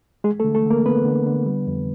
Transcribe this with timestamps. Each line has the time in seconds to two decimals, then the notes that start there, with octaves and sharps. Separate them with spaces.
0.24 G#3 G#4
0.40 A3 A4
0.44 D3
0.55 A3 A4
0.66 D3 A#3 A#4
0.86 D3 B3 B4
1.05 D3
1.26 D3
1.46 G3
1.67 F2